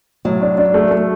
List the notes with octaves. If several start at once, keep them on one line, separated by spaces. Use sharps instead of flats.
A2 F#3
D4
D4
A3
A3